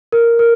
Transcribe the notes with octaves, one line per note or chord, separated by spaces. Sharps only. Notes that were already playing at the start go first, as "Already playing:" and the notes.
A#4
A#4